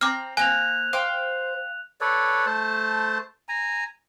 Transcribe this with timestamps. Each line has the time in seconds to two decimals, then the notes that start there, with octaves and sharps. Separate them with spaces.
0.01 C4 A#5 D6 F6
0.37 A#3 C4 G#5 F#6 F7
0.93 C5 F5 G5 D6
2.01 A4 B4 C#5 D5
2.46 A3 C5 A5
3.49 G#5 A#5